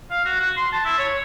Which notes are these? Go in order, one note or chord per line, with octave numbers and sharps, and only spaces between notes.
F5
F#4
F#4
C6
A5
E4
C#5